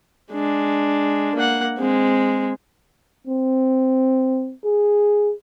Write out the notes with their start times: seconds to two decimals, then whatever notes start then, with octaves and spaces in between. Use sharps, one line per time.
0.32 G#3 D4
1.35 A#3 F#5
1.78 G#3 C4
3.27 C4
4.65 G#4